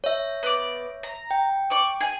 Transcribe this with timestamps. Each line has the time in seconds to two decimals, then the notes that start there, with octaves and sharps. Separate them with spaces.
0.04 C#5 E5
0.43 B3 D5
1.03 A#5
1.31 G5
1.70 D5 C#6
2.01 G#4 G#5